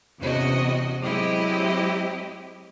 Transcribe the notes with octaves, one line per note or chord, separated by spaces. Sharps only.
E2 C3 C#4 F#4 D#5
F#3 G#3 C4 E4 G4 D#5